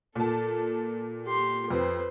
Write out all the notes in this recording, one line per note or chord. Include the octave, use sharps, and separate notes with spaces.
A#2 A4 A5
G4 C6
F2 B4 C5